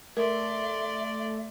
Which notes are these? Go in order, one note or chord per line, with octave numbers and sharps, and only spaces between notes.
A3 A#4 D5 E5 C6